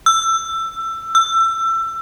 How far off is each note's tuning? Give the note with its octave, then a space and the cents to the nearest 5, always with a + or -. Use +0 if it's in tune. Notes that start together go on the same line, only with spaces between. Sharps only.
E6 +20
E6 +25